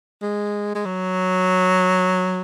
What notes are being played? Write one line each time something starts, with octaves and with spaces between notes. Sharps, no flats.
G#3
G#3
F#3